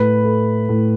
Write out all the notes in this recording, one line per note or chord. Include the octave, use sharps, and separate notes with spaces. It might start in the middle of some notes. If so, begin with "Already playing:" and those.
Already playing: A2 B4 B5
A3
A2